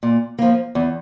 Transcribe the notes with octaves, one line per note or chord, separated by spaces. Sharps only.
A#2
F3 A#3
E2